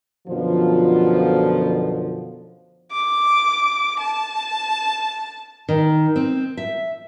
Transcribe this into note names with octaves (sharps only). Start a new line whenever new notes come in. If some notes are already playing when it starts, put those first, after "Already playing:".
F#2 B2 D3 F3
D6
A5
D#3
C4
E5